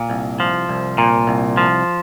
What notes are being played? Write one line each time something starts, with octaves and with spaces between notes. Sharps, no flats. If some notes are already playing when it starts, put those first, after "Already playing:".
Already playing: A#2
C2
F3
C2
A#2
C2
F3